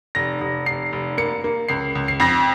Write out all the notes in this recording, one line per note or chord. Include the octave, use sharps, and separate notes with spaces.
F1 A#6
F1
F1 C7
F1
A#3 C#7
A#3
C#2 C7
C#2
C7
F2 A#6